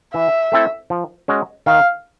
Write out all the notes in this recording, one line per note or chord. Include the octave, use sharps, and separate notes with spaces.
E3 E5
A3 C4 E4 A4
F3
G#3 C#4 F#4
D#3 F5